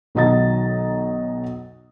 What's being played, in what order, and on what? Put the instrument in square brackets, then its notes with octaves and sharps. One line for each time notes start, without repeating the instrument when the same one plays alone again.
[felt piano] B1 D#3 F#3 D#5 A#5 A6